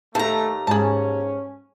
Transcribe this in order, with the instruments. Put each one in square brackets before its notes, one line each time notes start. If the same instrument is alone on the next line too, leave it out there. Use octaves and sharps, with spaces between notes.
[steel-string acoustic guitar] D#2 A#5 [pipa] D#3 A5 [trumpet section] A3
[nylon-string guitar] G#2 [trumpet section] C#4 [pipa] G#4 A5